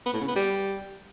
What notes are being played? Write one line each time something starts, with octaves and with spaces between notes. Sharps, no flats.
B3
A2
C#3
B3
G3